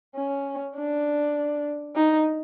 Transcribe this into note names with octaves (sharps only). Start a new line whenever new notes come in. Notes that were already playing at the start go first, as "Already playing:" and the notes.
C#4
D4
D#4